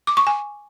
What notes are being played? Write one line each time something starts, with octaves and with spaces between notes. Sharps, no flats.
D6
C#6
G#5